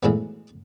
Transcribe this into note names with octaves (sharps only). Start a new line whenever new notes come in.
B1 A2 E3 G#3 B3